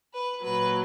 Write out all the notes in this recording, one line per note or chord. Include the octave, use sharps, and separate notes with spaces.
B4
A#2 F#3 B4